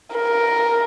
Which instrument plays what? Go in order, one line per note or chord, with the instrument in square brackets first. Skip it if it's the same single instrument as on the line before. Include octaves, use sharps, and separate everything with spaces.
[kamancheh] A#4